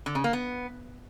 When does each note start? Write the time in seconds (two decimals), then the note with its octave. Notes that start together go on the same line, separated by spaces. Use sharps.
0.06 D3
0.15 C#3
0.24 A#3
0.33 B3